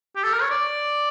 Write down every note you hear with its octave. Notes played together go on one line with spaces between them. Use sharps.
G4
A4
A#4
C#5
D5